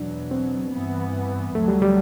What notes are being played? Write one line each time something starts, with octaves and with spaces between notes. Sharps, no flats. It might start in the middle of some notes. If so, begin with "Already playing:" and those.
Already playing: E2 B2 F#3 D4
C4
G2 E3 B3
D2 D3 F#3 A3
G3
G3